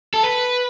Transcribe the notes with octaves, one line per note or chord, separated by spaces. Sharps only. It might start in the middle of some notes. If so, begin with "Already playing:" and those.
A4
B4